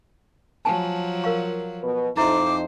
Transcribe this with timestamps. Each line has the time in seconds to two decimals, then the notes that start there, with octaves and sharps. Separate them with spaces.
0.65 F3 F#3 G4 G#5 A5
1.24 A#4 F5 C#6
1.83 B2 B4
2.17 F2 D#4 E4 F#4 C5 E5 D6